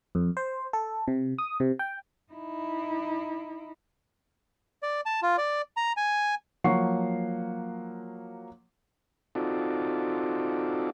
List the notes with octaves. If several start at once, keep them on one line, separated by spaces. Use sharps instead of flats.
F2
C5
A4
C3
D#6
C3
G5
D#4 E4
D5
A5
F4
D5
A#5
G#5
F3 F#3 A#3 F#5 C#6 C7
C4 D#4 F4 F#4 A4 D5